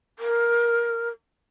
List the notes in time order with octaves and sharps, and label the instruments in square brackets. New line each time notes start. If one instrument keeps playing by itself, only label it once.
[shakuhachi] A#4